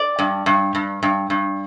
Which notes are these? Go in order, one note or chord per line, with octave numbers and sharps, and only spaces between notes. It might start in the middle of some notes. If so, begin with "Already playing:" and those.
Already playing: D5
G2
G2
G2
G2
G2